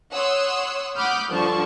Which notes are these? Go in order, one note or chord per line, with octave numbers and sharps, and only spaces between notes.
C#5 F#5 C6 D#6 E6
F#5 B5 D6 D#6 F6 G6
G2 D3 F3 A5 C#6